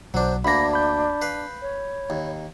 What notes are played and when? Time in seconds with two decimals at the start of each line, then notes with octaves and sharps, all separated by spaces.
0.14 B1 F#3 D4 C5
0.45 D2 A#3 D4 B5 A#6
0.73 B5 G6
1.22 B4 F5
1.62 C#5
2.10 D#2